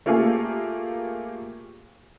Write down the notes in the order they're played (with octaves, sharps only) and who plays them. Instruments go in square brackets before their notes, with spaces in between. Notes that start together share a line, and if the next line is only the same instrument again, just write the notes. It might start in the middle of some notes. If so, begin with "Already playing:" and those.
[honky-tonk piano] A3 A#3 F4 G4 G#4